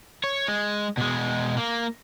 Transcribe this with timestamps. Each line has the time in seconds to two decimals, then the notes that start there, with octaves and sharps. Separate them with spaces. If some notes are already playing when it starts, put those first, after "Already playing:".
0.24 C#5
0.48 G#3
0.97 B2 G#3
1.57 A#3